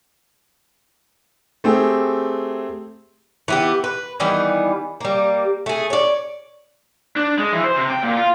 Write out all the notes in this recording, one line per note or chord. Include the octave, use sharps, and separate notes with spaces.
A3 C4 G4 G#4
E3 B3 G4
B4
D#3 E3 G3 B3
G3 A#3
A3 G#4
C#5 D5
D4
G#3
E3
C5
C3
G5
A#2
F4